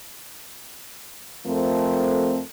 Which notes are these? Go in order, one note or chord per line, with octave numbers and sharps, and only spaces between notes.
F2 F3 A3 C4 A4 A#4